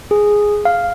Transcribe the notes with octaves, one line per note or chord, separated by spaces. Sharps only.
G#4
F5